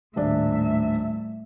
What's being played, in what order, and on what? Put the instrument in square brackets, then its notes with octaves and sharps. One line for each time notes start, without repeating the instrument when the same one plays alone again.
[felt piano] D#1 D4 [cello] A2 E5